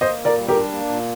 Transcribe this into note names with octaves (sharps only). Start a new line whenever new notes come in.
A#3 C5 D#5
A#2
A#4 D5
G3
G4 A#4
D4
A#3
A#2